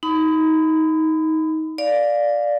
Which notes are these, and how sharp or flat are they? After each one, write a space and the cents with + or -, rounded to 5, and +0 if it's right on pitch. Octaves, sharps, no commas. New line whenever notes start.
D#4 +20 B5 +30
D5 +0 F5 +10